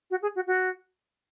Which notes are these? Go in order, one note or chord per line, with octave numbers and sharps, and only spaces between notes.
F#4
G#4
F#4
F#4